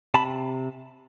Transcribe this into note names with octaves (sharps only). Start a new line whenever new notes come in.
C3 A5 B5